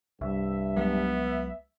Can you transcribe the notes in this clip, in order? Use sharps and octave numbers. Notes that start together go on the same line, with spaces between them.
C2 G2 E5
C2 F#3 G#3 B3